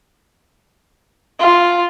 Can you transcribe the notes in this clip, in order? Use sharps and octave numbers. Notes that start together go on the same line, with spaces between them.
F4